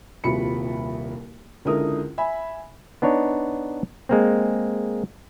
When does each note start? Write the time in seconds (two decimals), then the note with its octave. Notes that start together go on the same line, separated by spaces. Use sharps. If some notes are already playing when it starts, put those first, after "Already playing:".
0.24 D#1 C2 F3 F#4 B5 C#7
1.65 C#2 D3 E4 A#4 D#6
2.18 E5 G#5 B5
3.02 B3 D4 D#4 C#5
4.09 G#3 A#3 C4